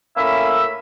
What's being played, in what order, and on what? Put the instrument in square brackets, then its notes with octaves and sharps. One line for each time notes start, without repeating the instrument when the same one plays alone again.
[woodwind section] A2 A#3 C#4 E5 B5 E6